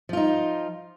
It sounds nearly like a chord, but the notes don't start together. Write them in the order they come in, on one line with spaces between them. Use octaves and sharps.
F3 F4 D#4